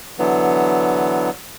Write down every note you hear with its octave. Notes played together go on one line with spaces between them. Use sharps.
D3 E3 F#3 B3